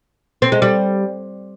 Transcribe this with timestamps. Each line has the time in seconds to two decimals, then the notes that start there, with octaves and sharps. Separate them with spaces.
0.42 C4
0.52 G#3
0.62 G3